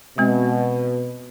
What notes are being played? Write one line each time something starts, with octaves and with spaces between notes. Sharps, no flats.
B2 G#3 C4